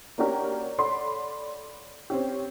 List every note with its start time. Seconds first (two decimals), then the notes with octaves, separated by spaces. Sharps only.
0.18 A#3 C#4 D4 F#4 G4 A#4
0.78 A4 C#5 D5 F#5 B5 C6
2.10 C4 C#4 G4